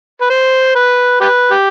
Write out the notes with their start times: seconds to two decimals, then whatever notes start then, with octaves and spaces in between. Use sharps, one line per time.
0.21 B4
0.30 C5
0.75 B4
1.21 G4 B4
1.51 G4